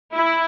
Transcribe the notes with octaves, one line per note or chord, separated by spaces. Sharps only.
E4